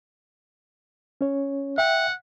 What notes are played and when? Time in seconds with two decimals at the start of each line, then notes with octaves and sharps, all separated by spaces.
1.21 C#4 C#5
1.78 E5 F#5 G5